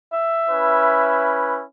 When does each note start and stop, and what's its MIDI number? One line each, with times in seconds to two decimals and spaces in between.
0.13 1.36 76
0.49 1.61 61
0.49 1.61 64
0.49 1.61 71